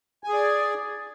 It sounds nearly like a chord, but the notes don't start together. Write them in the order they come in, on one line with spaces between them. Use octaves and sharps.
G#5 G#4 D5